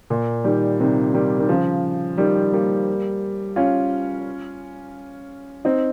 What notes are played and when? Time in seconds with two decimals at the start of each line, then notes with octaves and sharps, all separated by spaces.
0.10 A#2
0.44 D#3 G3
0.80 C3 D#3
1.14 D#3 G3
1.39 D#3
1.49 C#3 F3
2.18 D#3 G3
2.53 G3 A#3
3.56 C#4 F4
5.65 C4 D#4